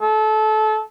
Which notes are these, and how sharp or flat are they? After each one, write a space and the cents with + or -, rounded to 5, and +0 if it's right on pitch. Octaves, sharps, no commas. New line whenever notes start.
A4 -25